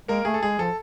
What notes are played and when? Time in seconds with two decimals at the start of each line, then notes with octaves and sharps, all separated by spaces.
0.08 G#3 A#3 A#4
0.25 A3 G#4
0.34 A4
0.42 G#3 G#4
0.58 F3 A4